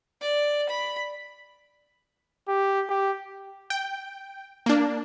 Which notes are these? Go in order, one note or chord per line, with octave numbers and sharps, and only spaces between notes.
D5
B5
G4
G4
G5
A#3 D4